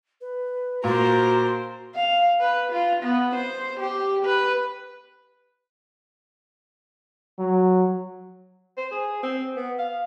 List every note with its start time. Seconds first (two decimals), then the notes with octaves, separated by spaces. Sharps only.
0.21 B4
0.84 A#2 F#4 A#4 C5 A#5
1.95 F5
2.40 B4
2.72 F4
3.03 B3
3.35 C5
3.79 G4
4.25 B4
7.39 F#3
8.77 C5
8.92 G#4
9.23 C4
9.56 B3
9.79 F5